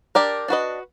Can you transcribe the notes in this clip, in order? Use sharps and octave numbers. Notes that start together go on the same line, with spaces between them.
D4 G4 A#4 D5
D4 F#4 B4 D#5